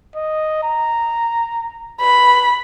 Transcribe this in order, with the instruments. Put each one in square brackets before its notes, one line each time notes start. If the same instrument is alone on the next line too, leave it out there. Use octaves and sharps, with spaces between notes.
[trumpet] D#5
A#5
[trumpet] B4 [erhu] B5